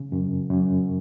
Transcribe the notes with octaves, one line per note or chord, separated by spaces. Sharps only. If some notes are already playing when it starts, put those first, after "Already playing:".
Already playing: C#3
F#2
F#2